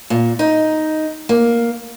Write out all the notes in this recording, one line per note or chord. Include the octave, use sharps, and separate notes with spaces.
A#2
D#4
A#3